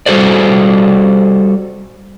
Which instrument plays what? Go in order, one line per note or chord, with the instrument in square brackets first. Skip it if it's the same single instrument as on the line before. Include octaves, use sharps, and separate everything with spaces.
[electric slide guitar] G3 F#4 A4 C5 D5